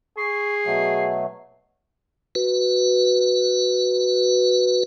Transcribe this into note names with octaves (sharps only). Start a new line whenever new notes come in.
G#4 C#6 C7
B2 F#3 A3
F#4 B4